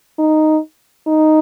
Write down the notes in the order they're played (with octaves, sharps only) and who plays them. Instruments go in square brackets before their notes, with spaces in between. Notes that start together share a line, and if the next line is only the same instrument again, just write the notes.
[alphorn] D#4
D#4